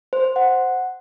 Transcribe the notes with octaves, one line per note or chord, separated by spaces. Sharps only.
C5
C5
F#5